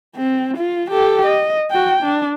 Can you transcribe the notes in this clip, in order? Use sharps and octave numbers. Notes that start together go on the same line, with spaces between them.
C4
F4
G4 A4
D#5
F#4 G5
D4